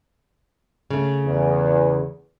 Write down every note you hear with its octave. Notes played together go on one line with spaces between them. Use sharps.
C#3 A3
E2